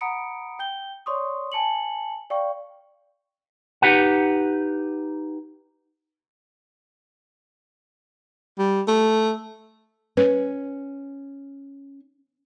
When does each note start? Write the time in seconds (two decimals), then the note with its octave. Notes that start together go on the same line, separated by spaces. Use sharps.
0.01 F#5 A#5 B5 D#6 C#7 D7
0.59 G5 G6 G7
1.06 C#5 D5 C6 C#6 D#6
1.52 G#5 A5 C#7 F#7
2.30 D5 F5 G5 C#6
3.82 D#4 G4 B4 F#5
8.59 G3
8.88 A3
10.17 C#4 B4